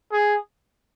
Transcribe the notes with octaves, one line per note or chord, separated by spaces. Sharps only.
G#4